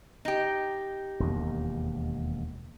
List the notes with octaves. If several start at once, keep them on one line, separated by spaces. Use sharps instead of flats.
D#4 G4
E1 D#2